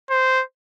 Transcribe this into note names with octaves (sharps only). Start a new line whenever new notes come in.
C5